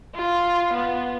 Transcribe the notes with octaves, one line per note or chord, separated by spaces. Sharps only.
F4
B3